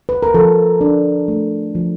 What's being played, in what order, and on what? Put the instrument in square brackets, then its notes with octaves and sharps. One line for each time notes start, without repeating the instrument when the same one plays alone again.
[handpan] B4
A#4
F3 A4
D4
A3
F3